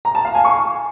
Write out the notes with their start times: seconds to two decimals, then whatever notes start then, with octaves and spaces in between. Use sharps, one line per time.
0.05 A#5
0.15 A5
0.25 F5
0.35 G#5
0.45 C#6